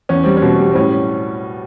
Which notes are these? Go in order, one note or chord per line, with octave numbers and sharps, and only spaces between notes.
E2 C#4
G3 C4
C#4
B2
G3
C4
A2 C#4